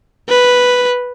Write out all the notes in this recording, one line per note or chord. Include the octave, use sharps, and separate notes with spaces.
B4